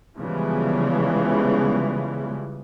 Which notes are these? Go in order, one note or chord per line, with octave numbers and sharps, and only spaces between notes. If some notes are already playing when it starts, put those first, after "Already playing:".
C#3 E3 F3 G3 G#3 B3